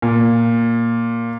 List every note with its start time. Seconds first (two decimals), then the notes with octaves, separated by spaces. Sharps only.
0.02 A#2